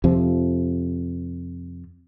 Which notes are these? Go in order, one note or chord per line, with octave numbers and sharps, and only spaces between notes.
F2 C3 F3